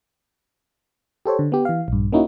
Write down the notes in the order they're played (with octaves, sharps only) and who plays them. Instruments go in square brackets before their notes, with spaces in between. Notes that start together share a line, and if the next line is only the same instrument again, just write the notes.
[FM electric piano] G4 A4 C5 C#5
D3
B3 G4
E3 F5
A#1 G2
A#3 C#4 D#4 E4 F#4